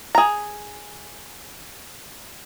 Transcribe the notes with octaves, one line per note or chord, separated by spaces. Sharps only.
G#4 A#5